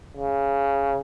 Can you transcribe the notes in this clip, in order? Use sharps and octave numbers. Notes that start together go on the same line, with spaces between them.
C#3